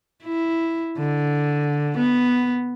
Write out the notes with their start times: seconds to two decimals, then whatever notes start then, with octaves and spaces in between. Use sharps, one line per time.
0.23 E4
0.98 D3
1.97 B3